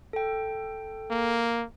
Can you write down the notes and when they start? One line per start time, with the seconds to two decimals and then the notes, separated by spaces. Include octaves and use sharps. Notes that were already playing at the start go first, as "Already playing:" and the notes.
0.13 A4 G5
1.10 A#3